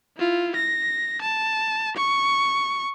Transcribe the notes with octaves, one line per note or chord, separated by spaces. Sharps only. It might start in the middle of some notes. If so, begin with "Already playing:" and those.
E4 F4
A#6
A5
C#6